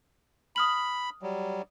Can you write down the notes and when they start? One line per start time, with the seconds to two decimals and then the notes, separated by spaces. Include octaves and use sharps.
0.56 B5 D#6 F6 F#7
1.22 F#3 G3